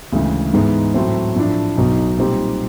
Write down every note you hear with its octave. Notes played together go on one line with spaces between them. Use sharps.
D2 C#3 E3 G#3
G#2 E3 G#3 B3 D#4
A2 F#3 A3 C4
A2 F3 A3 D4
B1 B2 F#3 B3 D#4
A#2 G3 C4 D#4 G4